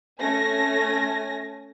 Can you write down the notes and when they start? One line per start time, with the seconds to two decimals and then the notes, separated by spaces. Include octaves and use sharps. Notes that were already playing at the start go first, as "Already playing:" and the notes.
0.19 A3 C#4 G#5 A#6